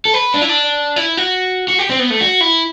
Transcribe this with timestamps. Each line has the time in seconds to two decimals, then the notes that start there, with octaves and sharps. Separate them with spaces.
0.05 A4
0.14 B4
0.34 D4
0.41 E4
0.49 D4
0.96 E4
1.17 F#4
1.68 F#4
1.79 G4
1.90 C4
2.00 B3
2.10 A3
2.21 F#4
2.41 E4